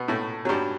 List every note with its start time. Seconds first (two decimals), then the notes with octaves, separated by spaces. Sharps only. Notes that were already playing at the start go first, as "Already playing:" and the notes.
Already playing: B2 B3
0.08 A2 A3
0.45 F#3
0.49 G2 G3